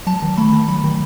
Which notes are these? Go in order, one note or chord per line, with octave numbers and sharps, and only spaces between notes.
F#3 A5
D#3
A3 B5
D#3
F#3 B5
D#3